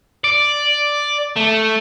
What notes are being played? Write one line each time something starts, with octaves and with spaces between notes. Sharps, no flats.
D5
A3